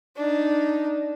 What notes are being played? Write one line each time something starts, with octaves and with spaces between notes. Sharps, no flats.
D4 D#4